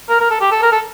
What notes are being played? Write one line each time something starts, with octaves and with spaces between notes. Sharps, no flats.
A#4
A#4
A4
G4
A4
A#4
A4